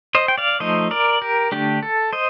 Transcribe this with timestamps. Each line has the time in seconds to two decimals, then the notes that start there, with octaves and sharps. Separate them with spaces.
0.15 C5 D#5
0.28 G5
0.38 D5 F5
0.60 F3 A3 D#4 C5 D#5
0.91 A#4 D5
1.22 G4 A#4
1.52 D3 A3 D4 G4
1.83 A4
2.13 C5 D#5